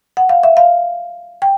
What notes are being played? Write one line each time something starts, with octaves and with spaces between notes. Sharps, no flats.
F#5
F5
E5
F5
G5